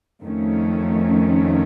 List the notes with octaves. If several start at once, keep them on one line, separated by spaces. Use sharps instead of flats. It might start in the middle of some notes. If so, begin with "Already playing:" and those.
F2 D#3 A3 C#4